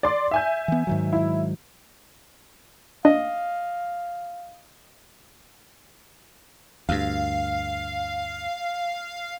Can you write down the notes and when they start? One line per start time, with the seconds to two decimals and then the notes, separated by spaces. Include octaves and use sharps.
0.03 D5 C6 D6
0.31 E5 G#5 G6
0.68 E3 B3
0.87 G#2 D#3 F#3
1.13 E4
3.05 D4 D#5 F5
6.89 D2 G2 F5